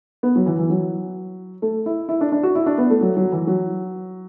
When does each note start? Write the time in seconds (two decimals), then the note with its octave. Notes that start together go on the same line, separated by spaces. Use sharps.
0.23 B3
0.36 F#3
0.46 E3
0.59 E3
0.70 F#3
1.62 A3
1.86 E4
2.09 E4
2.21 D4
2.32 D4
2.43 F#4
2.55 E4
2.66 D4
2.78 B3
2.90 A3
3.01 F#3
3.16 F#3
3.32 E3
3.47 F#3